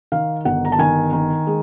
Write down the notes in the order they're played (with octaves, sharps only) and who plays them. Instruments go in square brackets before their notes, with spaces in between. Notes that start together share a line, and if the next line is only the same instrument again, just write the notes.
[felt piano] D#3 F5
G1 F#5
A#5
A5
D#3 G#5
D#3
G#3